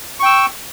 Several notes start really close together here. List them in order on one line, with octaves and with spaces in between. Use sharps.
C#6 G5 E6